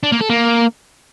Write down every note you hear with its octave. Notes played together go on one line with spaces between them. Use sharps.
D4
A#3
A4
A#3